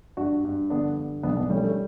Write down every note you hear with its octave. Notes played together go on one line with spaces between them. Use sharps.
G2 D4 F#4
G2
D3 B3 D4
G2
B1 B3 D4
B3 D4
G3 A3 C#4
A3 C#4